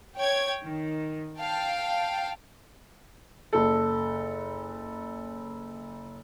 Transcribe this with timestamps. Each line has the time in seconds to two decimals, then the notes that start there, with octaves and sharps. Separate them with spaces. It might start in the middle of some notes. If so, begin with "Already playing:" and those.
0.16 C#5 G5 G#6
0.62 D#3
1.40 F5 G5 A5
3.53 F#1 A4